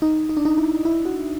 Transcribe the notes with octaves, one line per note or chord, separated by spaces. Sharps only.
D#4
D#4
D4
D#4
E4
E4
F#4